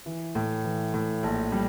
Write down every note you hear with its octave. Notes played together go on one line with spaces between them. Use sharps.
E3
A2
E3
A2
A#1
G3